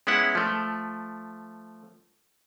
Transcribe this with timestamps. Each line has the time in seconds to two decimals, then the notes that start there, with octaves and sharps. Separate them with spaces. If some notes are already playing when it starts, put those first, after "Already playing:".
0.07 G#3 B3 C#4 E4 F#5
0.35 F3 A3